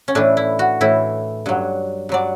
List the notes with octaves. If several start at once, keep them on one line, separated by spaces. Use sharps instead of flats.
C#4
A2 E3 D4
E4
F#4
A2 E3 E4
G2 F#3
G2 F#3 D5